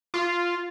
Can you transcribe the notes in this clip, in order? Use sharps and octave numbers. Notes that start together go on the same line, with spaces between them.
F4